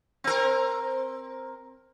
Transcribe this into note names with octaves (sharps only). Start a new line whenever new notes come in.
C4 A#4